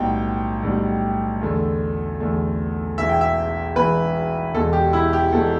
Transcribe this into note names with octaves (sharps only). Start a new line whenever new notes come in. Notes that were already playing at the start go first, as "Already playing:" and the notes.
Already playing: B1 A2 G3 B3 G5
B1 A2 G3 B3
E2 D3 A3
E2 D3 A3
E1 E2 E3 E5
G5
E5
E1 E2 E3 B4
E1 E2 B2 A4
G4
E4
G4
E1 E2 B2 A4